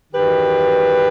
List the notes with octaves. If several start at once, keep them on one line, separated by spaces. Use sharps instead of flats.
E2 D#3 F#3 G4 B4